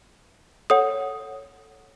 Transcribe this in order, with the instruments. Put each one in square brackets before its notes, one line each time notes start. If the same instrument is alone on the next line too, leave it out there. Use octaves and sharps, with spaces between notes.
[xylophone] A4 C#5 F#5 D#6